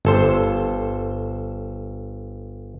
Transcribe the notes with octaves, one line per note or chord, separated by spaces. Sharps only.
G1 A4 C5